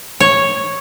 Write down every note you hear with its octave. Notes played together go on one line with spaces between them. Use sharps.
C#5